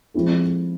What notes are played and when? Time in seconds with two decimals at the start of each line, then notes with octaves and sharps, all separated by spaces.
0.14 F3 G#3 C4 E4 A4